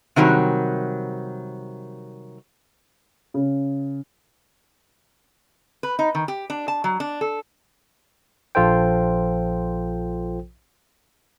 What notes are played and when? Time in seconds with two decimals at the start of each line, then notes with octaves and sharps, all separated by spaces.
0.16 C3 D#3 F#3 G3
3.34 C#3
5.83 B4
5.99 D#4
6.15 D#3
6.28 G4
6.50 D4
6.68 A5
6.84 F#3
7.00 D4
7.21 A4
8.55 A#1 F3 F4 A4 C5 G5